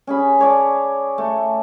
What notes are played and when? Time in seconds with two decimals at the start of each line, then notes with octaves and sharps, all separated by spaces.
0.07 C#4 G#4 B5
0.39 G#4 C#5 D5 A5
1.18 A3